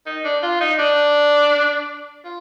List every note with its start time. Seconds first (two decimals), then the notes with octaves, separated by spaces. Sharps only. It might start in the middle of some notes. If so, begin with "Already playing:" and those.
0.06 D#4
0.25 D4
0.43 F4
0.61 D#4
0.79 D4
2.25 F4